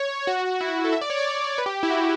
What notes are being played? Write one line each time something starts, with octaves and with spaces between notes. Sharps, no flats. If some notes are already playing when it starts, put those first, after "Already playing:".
Already playing: C#5
F#4
E4
F#4
A4
E5
D5
C#5
D5
B4
G4
E4
F#4